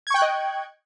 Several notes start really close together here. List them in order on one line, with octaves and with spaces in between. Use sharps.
G#6 C#6 G5 F#6 D#5